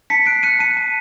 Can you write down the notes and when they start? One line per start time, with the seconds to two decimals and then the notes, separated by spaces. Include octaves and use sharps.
0.10 A5 B6 C#7
0.26 F#6 C7 D7
0.43 F#6 C#7 D#7
0.59 A5 C#7 D#7
0.77 A5